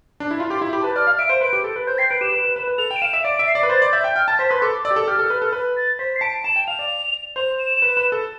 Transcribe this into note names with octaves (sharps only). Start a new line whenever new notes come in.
D4
E4
F4
G4 C6
E4
B5
G4
B4 A5
D5 F6
F5
E5 D7
C5
B4 D7
G4
A4
B4
C5 G6
G5 C7
B4 D7
G4 E7
B4
B4
B4
B4
A4 F7
G5
D7
F5 E7
E5
D5 D7
E5
C7
D5
B4
C5 A6
D5
E5 G6
G5
G5 F6
A5 A6
C5 B6
B4 C6
A4 D6
D5 E6
G4
A4
G4 F6
A4
B4
A4
B4
A6
C5 B6
C7
A5 D7
A5 E7
G5
F5 F7
D5
C5 F7
E7
B4
B4
A4